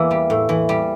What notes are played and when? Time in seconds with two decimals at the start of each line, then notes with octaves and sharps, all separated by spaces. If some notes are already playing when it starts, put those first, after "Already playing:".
Already playing: E2 E3 A#3
0.11 G3
0.30 A2
0.49 E3
0.69 G3